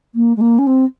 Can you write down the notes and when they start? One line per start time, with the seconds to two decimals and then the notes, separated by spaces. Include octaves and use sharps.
0.15 A#3
0.36 G#3
0.41 A#3
0.58 C#4
0.67 C4